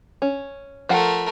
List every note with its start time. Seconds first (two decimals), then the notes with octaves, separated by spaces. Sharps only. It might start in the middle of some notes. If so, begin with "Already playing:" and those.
0.22 C#4
0.89 F3 A3 A#4 F#5